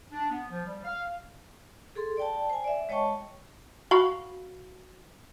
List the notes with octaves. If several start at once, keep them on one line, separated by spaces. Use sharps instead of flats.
D4
B3
F3
G3
F5
G#4 A4 C6
D5 G5 A5
C5 G#5
D5 E5
G#3 C#5 D#5 G5 A5 C#6
F#4 F5 B5